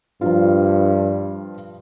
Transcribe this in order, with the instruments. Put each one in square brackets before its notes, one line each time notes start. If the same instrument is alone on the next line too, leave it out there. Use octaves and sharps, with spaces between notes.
[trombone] G2 [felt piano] F3 F4